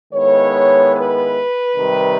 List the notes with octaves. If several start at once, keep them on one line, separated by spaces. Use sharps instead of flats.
D#3 G#3 B3 E4 C#5
B4
C3 D#3 G3